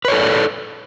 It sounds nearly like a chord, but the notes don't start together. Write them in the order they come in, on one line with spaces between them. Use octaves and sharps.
B4 C#5 A4 D5